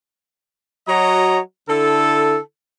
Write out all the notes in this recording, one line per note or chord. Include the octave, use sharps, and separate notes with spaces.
F#3 F#4 C#5 D#5 A#5
D3 E4 A4